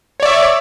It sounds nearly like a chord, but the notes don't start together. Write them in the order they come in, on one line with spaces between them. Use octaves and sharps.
C#5 D5 E5